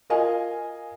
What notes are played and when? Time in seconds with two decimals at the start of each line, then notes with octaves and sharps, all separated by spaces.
0.10 F4 A#4 D#5 F5 G#5